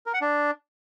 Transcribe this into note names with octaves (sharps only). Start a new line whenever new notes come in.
A#4
F#5
D4